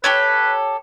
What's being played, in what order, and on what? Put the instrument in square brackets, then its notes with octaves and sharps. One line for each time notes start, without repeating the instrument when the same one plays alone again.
[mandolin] G4 A4 C#5 [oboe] B4